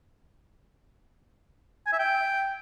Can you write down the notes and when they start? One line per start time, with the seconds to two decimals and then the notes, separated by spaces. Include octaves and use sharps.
1.86 G#5
1.93 E5
1.99 G5